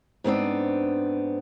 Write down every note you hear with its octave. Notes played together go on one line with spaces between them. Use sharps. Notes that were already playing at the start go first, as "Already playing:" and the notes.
G#2 B3 C4 D4